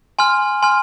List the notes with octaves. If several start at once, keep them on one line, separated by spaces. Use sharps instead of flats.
G#5 C6 F6
G#5 C6 F6